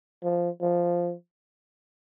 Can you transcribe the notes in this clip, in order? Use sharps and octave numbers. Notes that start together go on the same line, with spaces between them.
F3
F3